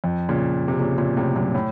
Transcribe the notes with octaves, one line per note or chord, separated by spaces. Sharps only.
F2
A#2 C#3
C3
A#2 C#3
A#2 C#3
A2 C3
F#2 A#2
A2